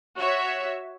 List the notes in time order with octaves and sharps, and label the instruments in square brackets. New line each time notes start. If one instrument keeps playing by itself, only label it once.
[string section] F#4 C#5 E5